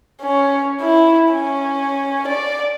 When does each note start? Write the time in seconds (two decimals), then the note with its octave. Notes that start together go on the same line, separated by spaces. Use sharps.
0.22 C#4
0.81 E4
1.33 C#4
2.28 D5